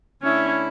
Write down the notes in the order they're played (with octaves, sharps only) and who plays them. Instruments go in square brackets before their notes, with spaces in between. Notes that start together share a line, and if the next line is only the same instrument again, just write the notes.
[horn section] D3 A3 E4 [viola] C#4